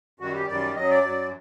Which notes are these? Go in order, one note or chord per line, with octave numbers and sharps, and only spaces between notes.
F#2 D#3 G3 F#4
G4
F#2 D#3 G3 D5
F#2 F#3 D#5
D5
F#2 F#3